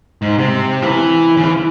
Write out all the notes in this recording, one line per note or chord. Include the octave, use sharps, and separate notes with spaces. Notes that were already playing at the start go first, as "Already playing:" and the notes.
G#2
C3
E3
C#3
E3